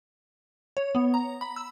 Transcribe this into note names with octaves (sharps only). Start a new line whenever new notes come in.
C#5
B3
A#5
B5
E6